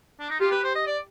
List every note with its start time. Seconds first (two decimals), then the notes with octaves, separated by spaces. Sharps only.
0.20 D4
0.30 D#4
0.40 F4 G4
0.51 B4
0.64 C5
0.75 D#5
0.86 D5